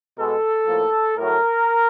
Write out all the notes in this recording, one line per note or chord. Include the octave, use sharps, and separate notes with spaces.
B2 G#3 A4
A2 F3 A#3
A2 F#3 A3 A#4